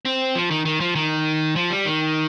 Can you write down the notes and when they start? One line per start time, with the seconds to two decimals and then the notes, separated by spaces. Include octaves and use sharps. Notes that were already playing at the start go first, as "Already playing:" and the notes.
0.05 C4
0.35 F3
0.51 D#3
0.65 D#3
0.80 F3
0.95 D#3
1.56 F3
1.70 G3
1.85 D#3